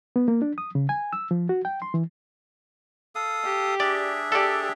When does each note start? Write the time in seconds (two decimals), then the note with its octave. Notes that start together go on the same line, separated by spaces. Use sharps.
0.16 B3
0.28 A#3
0.42 D4
0.58 D#6
0.75 C#3
0.89 G#5
1.13 E6
1.31 F3
1.49 F#4
1.65 G5
1.82 C6
1.94 E3
3.15 A4 F5 D#6
3.44 G4
3.80 D4 G#4 D5 E5
4.32 G4 A4 D5